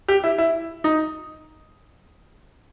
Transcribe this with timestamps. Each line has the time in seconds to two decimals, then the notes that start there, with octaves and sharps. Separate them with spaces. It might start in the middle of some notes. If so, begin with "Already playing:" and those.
0.08 G4
0.24 E4
0.38 E4
0.84 D#4